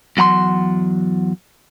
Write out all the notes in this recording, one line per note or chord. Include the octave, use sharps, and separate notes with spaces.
E2 F#3 F#5 A#5 C6